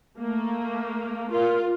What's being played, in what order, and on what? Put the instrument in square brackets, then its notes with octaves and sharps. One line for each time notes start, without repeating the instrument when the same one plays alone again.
[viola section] A3 A#3
[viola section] F4 [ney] A#4